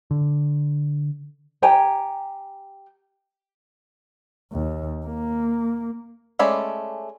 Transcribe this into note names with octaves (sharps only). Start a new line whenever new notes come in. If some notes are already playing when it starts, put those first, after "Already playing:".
D3
G4 G5 G#5 A#5
D#2
A#3
G#3 A3 C#4 D5 B5